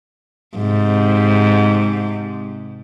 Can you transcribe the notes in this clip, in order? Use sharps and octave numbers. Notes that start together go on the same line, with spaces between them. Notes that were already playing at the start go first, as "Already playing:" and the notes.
G#2 C3